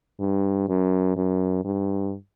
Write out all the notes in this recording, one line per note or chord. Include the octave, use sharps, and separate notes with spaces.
G2
F#2
F#2
G2